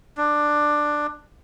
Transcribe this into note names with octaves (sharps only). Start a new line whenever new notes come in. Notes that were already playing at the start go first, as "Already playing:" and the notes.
D4